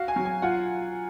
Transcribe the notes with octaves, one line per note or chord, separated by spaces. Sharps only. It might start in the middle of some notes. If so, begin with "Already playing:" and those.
Already playing: F#4 F5
G#5
F#3
G#5
F4 F#5